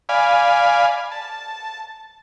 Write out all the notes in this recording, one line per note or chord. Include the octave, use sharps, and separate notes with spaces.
D5 F5 G#5 B5
A5